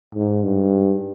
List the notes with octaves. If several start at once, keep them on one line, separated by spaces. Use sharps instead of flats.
G#2
G2